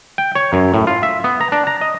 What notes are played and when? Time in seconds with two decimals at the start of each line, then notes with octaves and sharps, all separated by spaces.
0.18 G5
0.35 C#5
0.53 F#2
0.74 A2
0.87 F4
1.03 E5
1.24 B3
1.41 A#5
1.52 D4
1.67 A#5
1.81 D#5